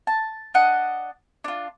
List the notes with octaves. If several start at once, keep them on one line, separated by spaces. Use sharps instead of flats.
A5
D4 D#5 F#5
D4 F4